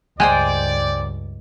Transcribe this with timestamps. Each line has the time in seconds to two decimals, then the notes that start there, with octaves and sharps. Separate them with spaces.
0.20 C#2 G2 G#3 C5 D5 G5 G#5